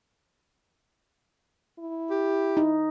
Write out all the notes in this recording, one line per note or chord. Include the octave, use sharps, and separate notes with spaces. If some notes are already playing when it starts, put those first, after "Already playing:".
E4
G4
D#4